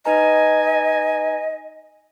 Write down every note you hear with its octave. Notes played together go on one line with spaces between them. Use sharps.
D#4 B4 D#5 G#5 A#5